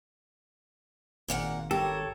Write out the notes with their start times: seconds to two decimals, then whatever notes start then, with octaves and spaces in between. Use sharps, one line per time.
1.28 G#1 A#2 A#3 F#5
1.71 G4 A4 A#4 C#5